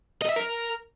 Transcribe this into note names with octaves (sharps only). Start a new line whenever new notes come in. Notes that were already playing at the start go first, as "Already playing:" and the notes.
D#5
E5
A#4